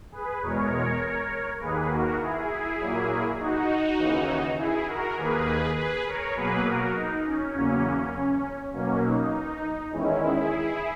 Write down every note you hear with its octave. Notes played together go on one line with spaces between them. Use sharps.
G#4 B4
E2 B2 G#3 A#4 C#5
D#2 D#3 A#3 G#4 B4
F#4 A#4
E4 G#4
A#2 F#3 A#3
D#4 F#4
D#2 C#3 E3
E4 G#4
F#4 A#4
D#2 D#3 A#3 G#4 B4
G#4 B4
A#4 C#5
B2 F#3 A#3 G#4 B4
F#4 A#4
D#4
C#4
E2 C#3 F#3 A#3
B2 F#3 A#3 C#4
D#4
E2 D#3 G#3 C#4 E4
E4 G#4